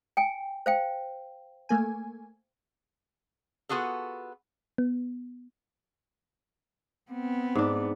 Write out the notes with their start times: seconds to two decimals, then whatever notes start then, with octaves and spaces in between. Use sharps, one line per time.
0.17 G5 G#5
0.66 C5 F5 G5
1.69 A3 A#3 G#5
3.69 B3 F4 F#4 G#4 A4
4.78 B3
7.11 B3 C4
7.55 G#2 D4